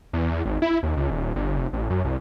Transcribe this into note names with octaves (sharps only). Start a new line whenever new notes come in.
E2
E2
G#1
E4
D#2
C#2
D#1
G1
F1
A1
F#2
C2